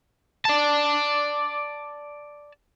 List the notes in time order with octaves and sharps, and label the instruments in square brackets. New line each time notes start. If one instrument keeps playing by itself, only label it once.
[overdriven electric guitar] D5 A5